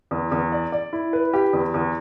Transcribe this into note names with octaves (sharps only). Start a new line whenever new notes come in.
E2
E2
D5
D5
E4
B4
G4
E2
E2